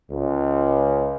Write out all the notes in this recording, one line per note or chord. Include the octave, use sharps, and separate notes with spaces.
C#2